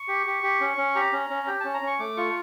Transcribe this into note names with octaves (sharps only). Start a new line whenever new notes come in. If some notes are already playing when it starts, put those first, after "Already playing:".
Already playing: C#6
G4
G4
G4
C#4
C#4
G4 A#5
C#4
C#4
G4
C#4 A5
A#5
C#4 C#6
A3 D6
F4 C#6